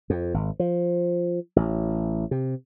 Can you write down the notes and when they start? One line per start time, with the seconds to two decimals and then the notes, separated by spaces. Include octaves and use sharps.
0.10 F2
0.34 G#1
0.59 F3
1.56 A1
2.31 C3